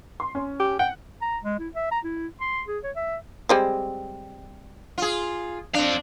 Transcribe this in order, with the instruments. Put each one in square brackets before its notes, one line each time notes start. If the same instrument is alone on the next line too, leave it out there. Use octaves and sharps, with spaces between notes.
[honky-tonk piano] C6
C#4
[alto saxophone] G4
[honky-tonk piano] F#5 [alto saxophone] G5
[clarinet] A#5
G#3
E4
E5
A#5
E4
C6
G#4
C#5
E5
[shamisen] G3 G#3 C4
[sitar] F4 G#4
[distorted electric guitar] C4 F5 [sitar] D4